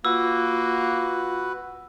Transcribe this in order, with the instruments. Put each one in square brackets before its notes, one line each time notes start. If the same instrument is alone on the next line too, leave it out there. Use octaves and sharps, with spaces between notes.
[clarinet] A#3 [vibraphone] F4 [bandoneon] F#4 B4 [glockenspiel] E6